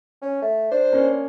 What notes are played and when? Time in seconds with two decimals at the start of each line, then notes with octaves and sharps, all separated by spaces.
0.22 C#4
0.42 A3
0.71 D4 C5
0.92 A#3 C#4